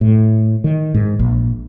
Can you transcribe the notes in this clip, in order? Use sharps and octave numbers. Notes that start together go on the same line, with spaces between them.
A2
D#3
G#2
A#1